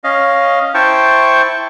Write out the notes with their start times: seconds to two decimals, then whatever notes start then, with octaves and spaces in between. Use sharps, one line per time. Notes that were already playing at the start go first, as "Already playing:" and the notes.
0.04 C#4 D#5 F5
0.75 E4 C5 G5 A5 C#6